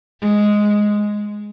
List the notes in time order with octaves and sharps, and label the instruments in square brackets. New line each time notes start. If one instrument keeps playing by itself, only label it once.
[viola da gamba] G#3